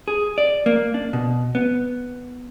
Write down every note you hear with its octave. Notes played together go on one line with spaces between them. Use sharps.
G#4
D5
A#3
D4
B2
B3